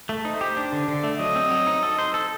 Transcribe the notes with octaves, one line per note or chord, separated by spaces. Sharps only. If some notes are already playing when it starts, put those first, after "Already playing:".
A3
D#4 C5
G4
D4
D3
D3 D5
A3
F#3 D#5
C4
F#3
D#4
A4
C5
A4